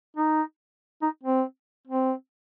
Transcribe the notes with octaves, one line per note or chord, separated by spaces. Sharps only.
D#4
D#4
C4
C4